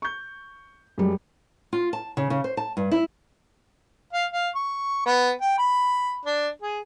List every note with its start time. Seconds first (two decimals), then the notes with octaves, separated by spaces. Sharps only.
0.02 C#6 G6
0.98 F#2 G3 G#3
1.73 F4
1.93 A5
2.17 C#3
2.30 C#3
2.44 C5
2.57 A5
2.77 G2
2.92 E4
4.13 F5
4.32 F5
4.55 C#6
5.06 B3
5.41 G5
5.58 B5
6.25 D4
6.62 G#4